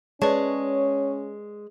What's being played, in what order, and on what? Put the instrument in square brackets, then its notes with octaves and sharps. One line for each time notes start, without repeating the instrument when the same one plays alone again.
[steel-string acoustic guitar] G#3 [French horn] C#4 [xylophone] B4 D5 A5 [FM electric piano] C#5